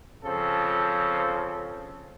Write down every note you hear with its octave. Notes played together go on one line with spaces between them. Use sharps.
C#3 F3 C4 A4